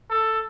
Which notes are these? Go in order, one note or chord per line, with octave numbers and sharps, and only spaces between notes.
A4